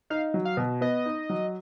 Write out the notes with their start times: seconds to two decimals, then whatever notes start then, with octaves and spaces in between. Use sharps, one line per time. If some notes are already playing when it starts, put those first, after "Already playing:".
0.10 D#4 F5
0.34 F#3
0.45 F5
0.57 B2
0.81 B3 D#5
1.06 D#4
1.30 F#3